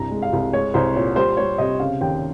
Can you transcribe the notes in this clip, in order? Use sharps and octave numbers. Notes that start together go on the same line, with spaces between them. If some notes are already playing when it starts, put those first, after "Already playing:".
Already playing: C2 G2 A#5
G#3
F5
C2
G#3 C#5
C2 C5
A#2 C#5
G3 C5
G3 C#5
C3 D#5
C#3 F5
D#2 G5